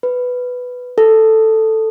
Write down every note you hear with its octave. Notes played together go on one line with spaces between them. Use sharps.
B4
A4